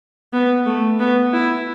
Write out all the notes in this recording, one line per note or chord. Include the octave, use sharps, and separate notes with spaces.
B3
A3
B3
E4